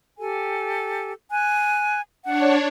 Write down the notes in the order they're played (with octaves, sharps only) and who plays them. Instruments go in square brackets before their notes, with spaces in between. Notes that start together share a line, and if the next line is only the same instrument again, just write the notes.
[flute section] G4 A4 G#5
G#5 F#6
[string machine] D4 C#5 [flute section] F#5